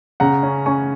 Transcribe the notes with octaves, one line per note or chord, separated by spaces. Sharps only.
C#3 F#5 A#5
C#4
C#4 G#5 C#6